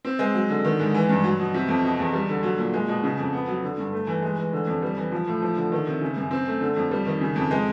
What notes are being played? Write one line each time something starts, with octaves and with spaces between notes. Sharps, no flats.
C4
G#3
F#3
D3
D#3
G#2
E3
G2
F#3
B2
C3
F2
B2
E2
G3
D3
F#3
A#2
G#3
B2
C#3
F2
B3
F#3
D3
G2
A3
E3
G#3
E3
D3
F2
G3
E3
F3
A2
F3
D3
D#3
C3
C#3
F#2
C4
A3
D3
F2
G3
D#3
C#3
F2
G#3